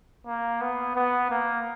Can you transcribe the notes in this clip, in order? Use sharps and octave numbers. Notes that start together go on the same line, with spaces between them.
A#3
B3
B3
A#3